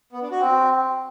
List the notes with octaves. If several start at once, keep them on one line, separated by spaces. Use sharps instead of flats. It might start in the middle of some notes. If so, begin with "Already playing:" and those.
B3
D4
F#4
C4